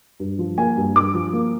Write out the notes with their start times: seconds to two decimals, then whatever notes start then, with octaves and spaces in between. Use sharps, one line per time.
0.20 G2
0.39 F3
0.58 A#3 G#5
0.77 G2
0.96 G2 D6
1.14 F3
1.33 A#3